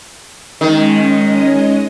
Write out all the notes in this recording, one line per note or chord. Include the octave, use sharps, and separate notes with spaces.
D#3 G#3 C#4 D#5